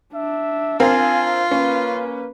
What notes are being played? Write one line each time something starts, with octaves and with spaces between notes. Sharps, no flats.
D4 E5
C4 F4 A#4 F5 G#5
A#3 C#4 B4